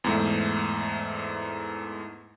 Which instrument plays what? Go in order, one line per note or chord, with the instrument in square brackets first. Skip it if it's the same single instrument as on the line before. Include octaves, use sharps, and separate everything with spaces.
[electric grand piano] E2 G#2 A3